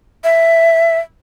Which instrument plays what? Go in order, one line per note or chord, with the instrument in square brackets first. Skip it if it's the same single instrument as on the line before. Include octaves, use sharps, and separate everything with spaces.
[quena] E5